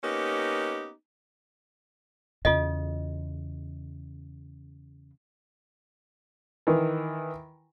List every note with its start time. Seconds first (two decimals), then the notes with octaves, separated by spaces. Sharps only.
0.03 A#3 B3 C#4 D#4 G4
2.45 E2 C#3 F4 A4 D#5
6.67 D#3 E3